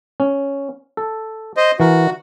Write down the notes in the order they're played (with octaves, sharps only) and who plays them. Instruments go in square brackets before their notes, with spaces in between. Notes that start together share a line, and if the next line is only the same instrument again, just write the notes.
[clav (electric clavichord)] C#4
A4
[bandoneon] C5 D#5
[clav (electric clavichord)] E3 A#4 [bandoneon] F#4